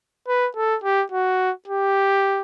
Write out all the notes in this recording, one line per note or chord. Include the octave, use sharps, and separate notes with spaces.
B4
A4
G4
F#4
G4